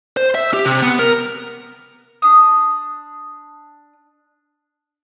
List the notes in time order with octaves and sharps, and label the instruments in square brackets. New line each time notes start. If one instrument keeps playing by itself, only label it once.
[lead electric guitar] C5
E5
G4
C3
B3
A#4
[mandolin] D4 D#6